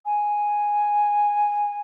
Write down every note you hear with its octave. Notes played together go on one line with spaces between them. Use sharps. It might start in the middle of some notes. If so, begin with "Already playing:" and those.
G#5